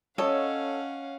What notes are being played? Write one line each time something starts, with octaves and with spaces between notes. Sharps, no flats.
C#4 A4 C#5 D#5 F5 F#5